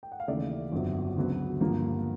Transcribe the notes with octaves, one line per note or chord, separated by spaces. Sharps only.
G5
F#5
F5
D#2 C#3 E3 A3 D5 E5
G1 F2 D3 F#3
D2 C#3 F#3 B3
G2 D3 F3 A#3